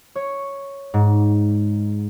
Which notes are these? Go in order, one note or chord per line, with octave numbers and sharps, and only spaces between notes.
C#5
G#2